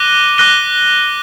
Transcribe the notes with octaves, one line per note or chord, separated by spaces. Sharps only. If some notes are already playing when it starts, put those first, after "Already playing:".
Already playing: D6 F#6 A#6 D#7 G7
D6 F#6 A#6 D#7 G7